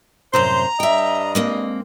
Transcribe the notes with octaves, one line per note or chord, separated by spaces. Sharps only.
F#2 A2 C3 C5 A#5
G2 D#5 E5 G5
G#3 A#3 C4